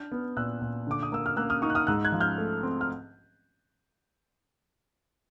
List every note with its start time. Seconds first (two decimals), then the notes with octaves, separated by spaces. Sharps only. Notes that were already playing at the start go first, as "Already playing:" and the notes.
Already playing: D4 F6 G6
0.12 B3
0.37 A#2 E6 F#6
0.61 A#2
0.87 D3 D6
1.03 D#6
1.12 A#3 E6
1.26 F6
1.37 A#3 E6 F#6
1.50 D#6 F6
1.62 D#4 C#6 D#6
1.70 F#6
1.75 D#6 F6
1.87 G#2 E6 F#6
2.05 F#6 G#6
2.12 F3
2.20 F6 G6
2.38 A3
2.63 C4
2.81 F6